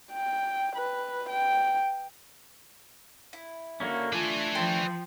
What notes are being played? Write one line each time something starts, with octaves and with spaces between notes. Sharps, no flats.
G5
B4
G5
E4
D3 A#3 C#4 F#4
A3 D4 F4 B4 G#5
F3 G5 A5 C6